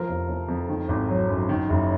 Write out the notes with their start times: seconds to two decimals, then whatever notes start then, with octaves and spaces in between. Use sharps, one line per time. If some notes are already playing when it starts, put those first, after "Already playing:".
Already playing: F3 A#4
0.08 F1
0.28 F1
0.48 F2
0.69 D#3
0.88 G#1
1.09 F#3
1.29 F#2
1.49 D#3
1.69 F#1